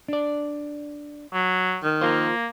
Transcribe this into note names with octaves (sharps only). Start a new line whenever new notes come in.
D4 D5
F#3
D#3
A#3 F4 C5